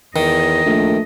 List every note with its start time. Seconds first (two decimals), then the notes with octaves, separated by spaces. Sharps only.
0.16 E2 D#3 D#5
0.66 A#1 A3